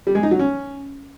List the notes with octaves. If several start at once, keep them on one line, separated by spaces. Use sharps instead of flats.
G3
G#3
D#4
F#3
C#4